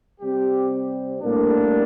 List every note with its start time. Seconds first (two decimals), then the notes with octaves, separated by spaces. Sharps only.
0.21 C3 G3 C4 G4
1.21 A2 G3 A#3 D4